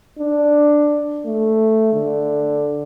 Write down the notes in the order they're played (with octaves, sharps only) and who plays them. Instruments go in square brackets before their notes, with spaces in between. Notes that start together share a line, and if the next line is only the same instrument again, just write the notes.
[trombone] D4
A3
D3